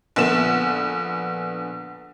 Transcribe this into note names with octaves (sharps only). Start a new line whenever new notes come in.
A#1 D3 B3 E7